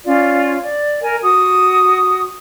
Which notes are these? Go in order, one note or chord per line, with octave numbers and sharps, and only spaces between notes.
C#4 F4 D5
D5
A#4 G#5
F#4 D#6